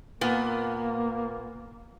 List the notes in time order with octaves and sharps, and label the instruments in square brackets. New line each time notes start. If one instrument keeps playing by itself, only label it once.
[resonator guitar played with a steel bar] A#2 B3 [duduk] A#3